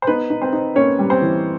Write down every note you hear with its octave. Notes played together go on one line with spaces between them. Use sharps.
C5
B3 D#4 B4
D#4
C4 C5
D#4
A#3 C#4 C#5
G3
C4 C5
E3